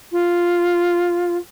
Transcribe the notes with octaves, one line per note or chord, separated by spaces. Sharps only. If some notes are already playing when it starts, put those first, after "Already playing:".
F4